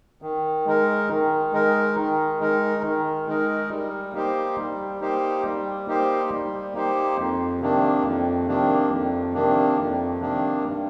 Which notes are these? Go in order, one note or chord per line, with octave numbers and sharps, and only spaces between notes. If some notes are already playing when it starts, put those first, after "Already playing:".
D#3
G#3 D#4 A#4
D#3
G#3 D#4 A#4
D#3
G#3 D#4 A#4
D#3
G#3 D#4 A#4
G3
A#3 D#4 G4 C5
G3
A#3 D#4 G4 C5
G3
A#3 D#4 G4 C5
G3
A#3 D#4 G4 C5
F2
C3 D#3 A#3 D4
F2
C3 D#3 A#3 D4
F2
C3 D#3 A#3 D4
F2
C3 D#3 A#3 D4
G2